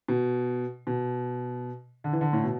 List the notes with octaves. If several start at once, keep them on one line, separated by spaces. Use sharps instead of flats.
B2
B2
D3
E3
D3
A2
B2